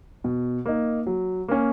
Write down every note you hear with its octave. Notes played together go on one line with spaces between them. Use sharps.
B2
A#3 D#4
F#3
A#3 C#4